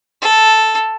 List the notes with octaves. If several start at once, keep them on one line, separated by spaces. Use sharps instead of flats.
A4